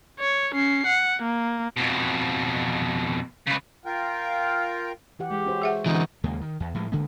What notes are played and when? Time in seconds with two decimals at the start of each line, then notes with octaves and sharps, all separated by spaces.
0.20 C#5
0.55 C#4 C7
0.86 F#5
1.22 A#3
1.77 F2 B2
3.47 C#3 B4
3.86 F4 A#4 F5 G5
5.19 E3 G4 F#5
5.31 G#3 G4
5.46 C#4 F#4 C5
5.62 G#4 E5 F#5
5.86 D3 E3 G#3 C4 D#4 F#4
6.24 D#2 C#3 G#3 A#3
6.41 D#3
6.60 E2
6.74 A2 F3 G#3
6.92 A1 C#3 G#3 A#3